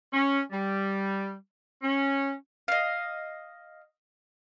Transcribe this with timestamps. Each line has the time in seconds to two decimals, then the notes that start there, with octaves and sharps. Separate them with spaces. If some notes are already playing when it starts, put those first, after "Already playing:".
0.13 C#4
0.52 G3
1.82 C#4
2.68 D#5 F5